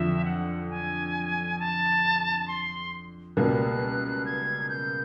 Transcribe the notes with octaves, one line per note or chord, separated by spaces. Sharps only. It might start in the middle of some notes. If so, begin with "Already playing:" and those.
Already playing: F2 D3 F3 E5
F#5
G#5
A5
C6
C#2 B2 G3 A#3 F#6
G#6
G6